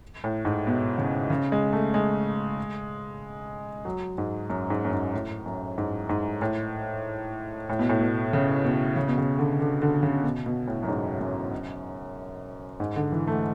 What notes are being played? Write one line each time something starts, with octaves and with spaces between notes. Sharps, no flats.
A2
G#2
B2
C#3
C#3
G#3
A3
G#3
F#3
G#2
F#2
G#2
F#2
G#2
A2
F#2
G#2
G#2
A2
A2
B2
A2
B2
C#3
B2
C#3
B2
C#3
D3
D3
D3
C#3
B2
B2
A2
F#2
G#2
F#2
G#2
D3
E3
A3